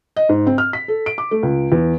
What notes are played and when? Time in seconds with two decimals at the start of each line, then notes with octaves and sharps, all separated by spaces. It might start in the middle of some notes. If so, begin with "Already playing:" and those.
0.16 D#5
0.29 G#2
0.47 C4
0.58 F6
0.73 B6
0.88 A4
1.06 D7
1.18 D6
1.31 A3
1.43 C#2
1.72 E2